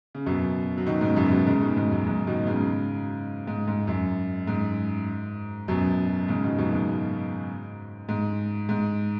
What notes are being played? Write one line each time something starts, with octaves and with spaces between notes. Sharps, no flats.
C#3
F#2 B2
F#3
B2 D#3
G#2 C#3
F#2 B2
B2 D#3
G#2 C#3
B2 D#3
G#2
F#2
G#2
B2 D#3
G#2 C#3
G#2
G#2
F#2
G#2
F#2 B2
G#2 C#3
B2 D#3
F#2 B2
G#2
G#2
G#2